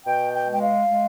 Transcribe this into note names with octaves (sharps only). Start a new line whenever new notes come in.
B2 G5
G5
G#3 G5
F5
G#3